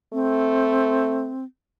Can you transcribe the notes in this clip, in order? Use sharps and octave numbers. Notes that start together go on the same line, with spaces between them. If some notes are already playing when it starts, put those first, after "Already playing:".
A3 C4